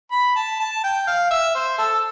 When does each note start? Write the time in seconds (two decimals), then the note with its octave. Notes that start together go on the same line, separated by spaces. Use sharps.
0.12 B5
0.36 A5
0.59 A5
0.84 G5
1.07 F5
1.31 E5
1.55 C5
1.78 A4